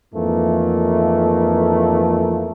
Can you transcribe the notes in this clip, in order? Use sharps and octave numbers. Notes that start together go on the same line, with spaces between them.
F2 G#2 E3 A3 A#3